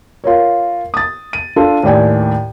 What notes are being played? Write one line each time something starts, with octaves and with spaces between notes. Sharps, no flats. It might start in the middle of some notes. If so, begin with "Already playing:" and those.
F4 A#4 C#5
D#6 A6
D#7
D4 F4 A4
D#2 A2 D5 G5 G#5